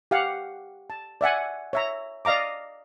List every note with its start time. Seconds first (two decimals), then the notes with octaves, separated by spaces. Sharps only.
0.11 G4 F5 F#5
0.90 A5
1.21 D5 E5 F#5 G#5
1.73 C#5 E5 A#5
2.25 D5 D#5 F5 A#5 D6